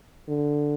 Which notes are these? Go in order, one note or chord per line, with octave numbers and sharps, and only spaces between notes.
D3